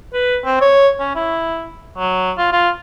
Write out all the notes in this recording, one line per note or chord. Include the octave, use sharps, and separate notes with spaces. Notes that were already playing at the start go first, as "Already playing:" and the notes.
B4
C4
C#5
C#4
E4
F#3
F4
F4